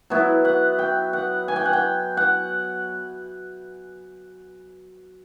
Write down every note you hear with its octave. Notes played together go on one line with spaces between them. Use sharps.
F#3 B3 E4
F#5
G5
F#5
G#5
G5
F#5
G5
F#5